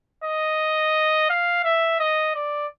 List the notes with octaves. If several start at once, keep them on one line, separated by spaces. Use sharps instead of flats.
D#5
F5
E5
D#5
D5